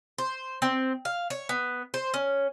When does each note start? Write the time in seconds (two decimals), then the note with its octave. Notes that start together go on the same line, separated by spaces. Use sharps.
0.18 C5
0.62 C4
1.05 F5
1.30 C#5
1.49 B3
1.94 C5
2.14 C#4